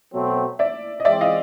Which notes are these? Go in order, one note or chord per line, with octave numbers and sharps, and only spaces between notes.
B2 F#3 A3 C4
D5 E5
D#5
E3 G#3 C4 D5 E5
D#5 F5